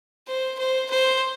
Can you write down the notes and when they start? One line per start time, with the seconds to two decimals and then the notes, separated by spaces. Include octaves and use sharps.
0.27 C5
0.59 C5
0.90 C5